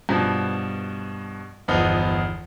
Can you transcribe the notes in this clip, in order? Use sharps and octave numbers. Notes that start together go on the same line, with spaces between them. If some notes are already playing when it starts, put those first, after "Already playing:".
G2 B2 F3
G1 E2 F3 B3 D#4